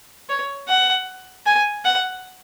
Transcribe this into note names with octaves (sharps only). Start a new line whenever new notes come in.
C#5
F#5
G#5
F#5